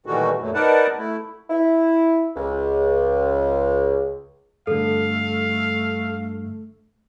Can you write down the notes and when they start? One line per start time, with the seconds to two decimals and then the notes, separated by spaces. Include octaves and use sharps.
0.06 A#2 D#3 E3 G3 A3 F#4
0.41 F#2 A#2 F#3 A3
0.54 D#4 A#4 B4 D5 F#5 A5
0.98 A3 E4
1.50 E4
2.36 C#2
4.67 G2 D3 A3 A4 F5